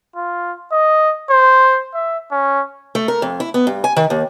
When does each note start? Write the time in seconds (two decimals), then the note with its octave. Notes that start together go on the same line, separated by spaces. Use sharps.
0.16 F4
0.72 D#5
1.30 C5
1.94 E5
2.31 C#4
2.95 A3
3.08 A#4
3.22 F2
3.40 E4
3.54 B3
3.67 G2
3.84 G#5
3.96 D#3
4.10 D#2